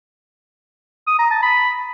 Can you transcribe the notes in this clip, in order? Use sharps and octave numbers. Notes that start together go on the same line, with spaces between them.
D#6
A#5
A5
B5